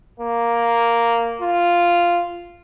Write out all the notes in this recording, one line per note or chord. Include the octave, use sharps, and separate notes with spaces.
A#3
F4